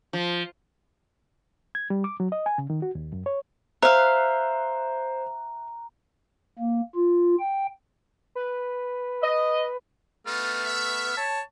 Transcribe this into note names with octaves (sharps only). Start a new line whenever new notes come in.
F3
G#6
G3
D6
F#3
D#5
G#5
C#3
D#3
F#4
D#2
F#2
C#5
C5 E5 F5 A#5 F#6
A#3
F4
G5
B4
D#5
A3 B3 D4 D#4 F4 F6
E5
C#5 A5